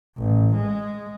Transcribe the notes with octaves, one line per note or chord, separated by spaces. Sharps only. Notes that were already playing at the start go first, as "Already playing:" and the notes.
A1
G#3